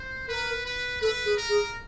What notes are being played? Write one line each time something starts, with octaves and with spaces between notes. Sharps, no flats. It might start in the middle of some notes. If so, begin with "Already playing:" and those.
Already playing: C5
A#4 B4
B4
A4 B4
G#4
A#4
G#4